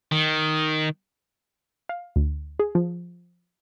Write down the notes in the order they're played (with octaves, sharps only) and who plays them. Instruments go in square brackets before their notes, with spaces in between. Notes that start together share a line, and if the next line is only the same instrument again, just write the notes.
[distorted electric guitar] D#3
[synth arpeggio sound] F5
D2
G#4
F3